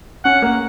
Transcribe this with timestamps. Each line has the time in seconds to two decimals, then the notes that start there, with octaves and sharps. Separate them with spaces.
0.24 C#4 F#5
0.42 A#3